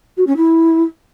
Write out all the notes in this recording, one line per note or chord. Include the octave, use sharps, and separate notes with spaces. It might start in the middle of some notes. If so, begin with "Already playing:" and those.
F#4
C#4
E4